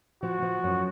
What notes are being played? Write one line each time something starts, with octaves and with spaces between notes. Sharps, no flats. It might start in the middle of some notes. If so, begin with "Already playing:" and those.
F3 F#4
F3
F#2